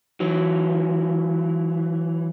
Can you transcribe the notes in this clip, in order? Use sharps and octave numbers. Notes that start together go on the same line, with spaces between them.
E3 F#3